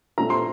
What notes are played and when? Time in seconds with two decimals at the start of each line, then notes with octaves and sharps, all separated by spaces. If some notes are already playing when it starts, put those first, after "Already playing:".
0.18 A#1 A#2 A3 C4 A#5
0.30 C6